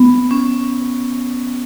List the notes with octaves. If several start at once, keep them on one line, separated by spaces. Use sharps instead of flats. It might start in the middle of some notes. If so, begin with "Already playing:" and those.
Already playing: B3
C#4